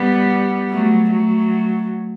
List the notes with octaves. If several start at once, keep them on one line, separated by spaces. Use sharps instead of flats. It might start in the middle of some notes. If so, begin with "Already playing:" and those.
Already playing: G3 B3
F#3 A3
F#3 A3